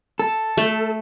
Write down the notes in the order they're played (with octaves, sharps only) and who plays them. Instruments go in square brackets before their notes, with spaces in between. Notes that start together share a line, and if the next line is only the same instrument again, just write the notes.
[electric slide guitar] A4
[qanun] A3